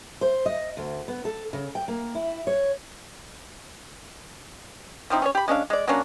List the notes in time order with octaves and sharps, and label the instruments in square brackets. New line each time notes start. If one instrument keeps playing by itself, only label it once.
[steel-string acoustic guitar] C5
D#5
D2
B3
A4
C#3
G5
A#3
E4
C#5
[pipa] F3 C4 D#4 E4
C#4 G#4 C#5
G4 B5
G#3 C#4 D4 F5
G#3 D5
F#3 A#3 C#4 D4